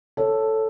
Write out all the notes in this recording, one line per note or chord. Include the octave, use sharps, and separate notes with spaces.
A4 C#5